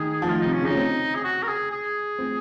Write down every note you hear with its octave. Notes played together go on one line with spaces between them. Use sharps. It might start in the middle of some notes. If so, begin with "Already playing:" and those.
Already playing: D#3 G#4
F3
D#3 F4
C3 D#4
C#4
C#3 D#4
C#4
C4
G#4
F#4
A#4
G#4
G#4
C4